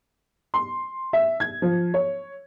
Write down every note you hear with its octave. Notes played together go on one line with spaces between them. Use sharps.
C6
E5
G#6
F3
C#5